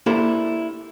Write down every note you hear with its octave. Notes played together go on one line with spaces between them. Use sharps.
A#3 D4 E4 G4 A4 C5